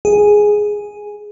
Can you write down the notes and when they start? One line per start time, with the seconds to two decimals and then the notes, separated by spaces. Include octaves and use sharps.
0.05 G#4